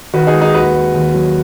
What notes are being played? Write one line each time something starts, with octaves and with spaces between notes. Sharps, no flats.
D#3 F#4 B4
D#4 G#4
G#3
D#4 G#4
D#2 F#4 B4
G#3
D#2
F#3